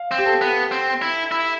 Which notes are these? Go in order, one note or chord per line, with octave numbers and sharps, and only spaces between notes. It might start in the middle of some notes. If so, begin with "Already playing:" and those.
Already playing: F5
C4
G4
A4
B3
C4
E4
E4